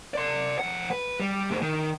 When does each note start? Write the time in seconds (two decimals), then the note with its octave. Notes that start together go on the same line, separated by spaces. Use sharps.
0.14 D5 C6
0.59 F2 F#5
0.91 B4
1.20 G3
1.50 D2 G#2
1.62 D#3